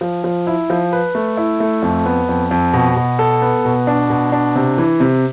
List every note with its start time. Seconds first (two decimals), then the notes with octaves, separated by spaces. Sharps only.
0.01 F3
0.24 F3
0.47 E4
0.70 F3
0.93 B4
1.15 A3
1.37 E4
1.60 A3
1.82 F2
2.06 B3
2.29 F2
2.51 F2
2.73 B2
2.96 B2
3.19 A4
3.42 B3
3.65 B2
3.87 D4
4.10 B2
4.32 D4
4.55 C3
4.78 E3
5.00 C3